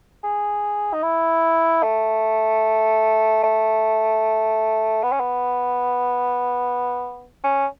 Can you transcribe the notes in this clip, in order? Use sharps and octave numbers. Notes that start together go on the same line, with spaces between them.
G#4
D#4
E4
A3
A3
B3
C#4
B3
C#4